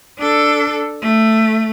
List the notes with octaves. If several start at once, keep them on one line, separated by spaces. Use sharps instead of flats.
D4 A4
A3